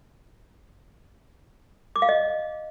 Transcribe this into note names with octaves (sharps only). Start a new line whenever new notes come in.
D6
F5
D#5